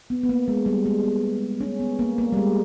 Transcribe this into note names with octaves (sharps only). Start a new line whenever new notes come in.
B3
B3
A#3
G#3
G3
G#3
B3
C#4
B3
A#3
A#3
G3
G#3